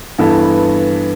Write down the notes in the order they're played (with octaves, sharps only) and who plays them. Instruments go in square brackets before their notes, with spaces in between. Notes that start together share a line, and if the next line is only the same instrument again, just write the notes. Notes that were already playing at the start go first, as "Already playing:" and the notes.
[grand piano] G2 E3 B3 E4 A4